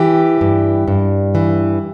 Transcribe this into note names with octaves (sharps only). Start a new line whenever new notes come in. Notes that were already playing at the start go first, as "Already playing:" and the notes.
Already playing: E3 G4
G2
G2
E3